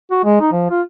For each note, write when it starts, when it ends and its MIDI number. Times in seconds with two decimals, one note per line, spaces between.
0.11 0.19 66
0.24 0.40 56
0.41 0.48 63
0.52 0.69 53
0.70 0.81 65